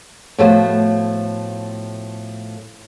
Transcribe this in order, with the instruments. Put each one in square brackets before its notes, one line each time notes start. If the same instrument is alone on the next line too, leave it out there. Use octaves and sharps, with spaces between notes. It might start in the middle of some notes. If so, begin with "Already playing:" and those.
[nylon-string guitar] A2 F3 A3 B3 F#4 C5